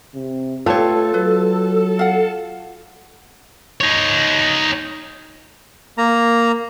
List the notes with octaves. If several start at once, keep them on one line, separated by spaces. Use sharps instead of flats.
C3
A3 F4 G4 A4 B4 C#5 A5
F#3 B4
F5 F#5
D#4 C#5
A#3 A#5